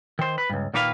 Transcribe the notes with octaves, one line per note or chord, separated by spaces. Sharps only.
D#3 C5
B4
C#2 G2
A#2 D#3 A#3 B4 F5